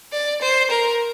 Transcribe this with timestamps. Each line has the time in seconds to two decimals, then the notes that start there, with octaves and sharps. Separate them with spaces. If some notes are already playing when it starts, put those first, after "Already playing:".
0.12 D5
0.41 C5
0.70 A#4